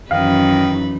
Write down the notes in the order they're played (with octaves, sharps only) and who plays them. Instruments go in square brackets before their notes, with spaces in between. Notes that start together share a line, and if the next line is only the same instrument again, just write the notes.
[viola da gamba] F#2 E3 B4 [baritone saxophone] D#3 [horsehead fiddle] D#4 [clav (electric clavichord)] F5